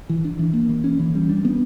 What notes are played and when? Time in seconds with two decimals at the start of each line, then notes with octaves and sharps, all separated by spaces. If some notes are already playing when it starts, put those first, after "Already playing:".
0.09 E3
0.25 D4
0.39 E3
0.54 A#3
0.69 E3
0.84 C#4
1.00 E3
1.15 G3
1.29 D4
1.45 B3